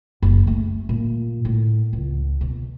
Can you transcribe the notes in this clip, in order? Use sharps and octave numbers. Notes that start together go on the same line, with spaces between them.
F#1
A3
A#2
A2
C#2
B2